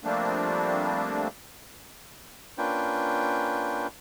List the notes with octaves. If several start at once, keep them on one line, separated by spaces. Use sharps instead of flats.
F3 G3 A3 A#3 C4 D4
A#3 C#4 D4 F4 B4 G5